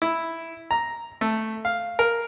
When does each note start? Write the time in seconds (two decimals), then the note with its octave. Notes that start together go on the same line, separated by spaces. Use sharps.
0.02 E4
0.71 A#5
1.21 A3
1.65 F5
1.99 A#4